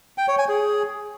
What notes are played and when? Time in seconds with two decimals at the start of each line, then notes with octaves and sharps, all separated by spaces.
0.18 G5
0.28 C#5
0.38 G#5
0.49 G#4